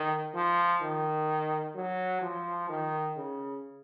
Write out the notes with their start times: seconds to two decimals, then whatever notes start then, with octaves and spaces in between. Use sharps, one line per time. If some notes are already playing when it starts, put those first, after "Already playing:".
Already playing: D#3
0.35 F3
0.82 D#3
1.75 F#3
2.22 F3
2.69 D#3
3.17 C#3